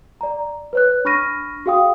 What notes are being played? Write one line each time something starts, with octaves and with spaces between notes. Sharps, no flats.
D5 A#5
B4 C#5 F#6
D4 B5 C#6 F6 A#6 D#7
F#4 G#4 F5 G5 D#6